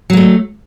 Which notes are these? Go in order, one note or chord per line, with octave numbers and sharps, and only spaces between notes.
F#3 A3 A#3